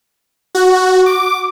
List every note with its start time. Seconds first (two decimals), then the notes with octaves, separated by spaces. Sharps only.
0.55 F#4
1.06 D6